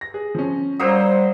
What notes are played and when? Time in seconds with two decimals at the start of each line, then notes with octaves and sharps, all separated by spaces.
0.01 A#6
0.14 G#4
0.35 F3 C#4
0.80 F#3 G3 A#3 C5 D#6 E6